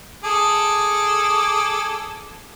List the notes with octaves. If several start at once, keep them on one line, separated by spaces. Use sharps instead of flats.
G#4 A4 D6